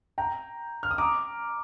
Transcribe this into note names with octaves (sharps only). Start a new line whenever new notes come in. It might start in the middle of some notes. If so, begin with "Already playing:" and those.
G5 A#5
F6
D#6
A#5 D6